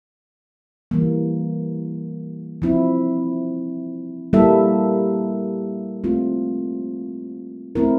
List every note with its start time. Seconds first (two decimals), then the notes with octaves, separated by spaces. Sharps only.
0.91 E3 G3 A#3
2.62 F3 C4 E4
4.33 G3 A#3 E4 A4 E5
6.04 A3 C4 F4
7.75 A3 C4 E4 A#4